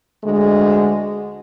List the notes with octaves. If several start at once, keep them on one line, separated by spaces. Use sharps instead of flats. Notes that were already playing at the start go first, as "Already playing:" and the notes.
D2 D3 G#3